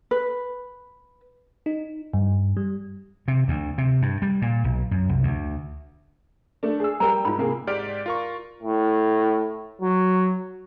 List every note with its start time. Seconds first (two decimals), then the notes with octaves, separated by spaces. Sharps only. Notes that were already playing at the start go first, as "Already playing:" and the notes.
0.11 B4
1.66 D#4
2.13 G2
2.57 G3
3.28 C3
3.48 D2
3.78 C3
4.02 G2
4.22 G3
4.42 A#2
4.64 B1
4.91 F#2
5.09 C2
5.23 D2
6.63 A3 D4
6.80 G#4 E6
7.00 G3 A#4 G5 A#5
7.25 G#2 F4 B5
7.38 C3 A#3 G#4
7.67 G#2 G4 D5 F6 D7
8.06 F4 A#4 C#6
8.63 A2
9.81 F#3